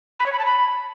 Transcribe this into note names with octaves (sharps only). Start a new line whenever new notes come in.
B5
C#5
B5
A5
B5